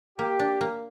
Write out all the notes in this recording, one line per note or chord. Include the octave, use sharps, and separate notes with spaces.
A#3 G4
D4
A#3